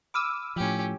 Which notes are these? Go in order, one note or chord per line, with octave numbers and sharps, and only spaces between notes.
B5 D6 E6 F6 D#7
A2 F3 C#4 G4